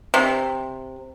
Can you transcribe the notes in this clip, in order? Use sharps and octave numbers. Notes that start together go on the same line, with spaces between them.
C3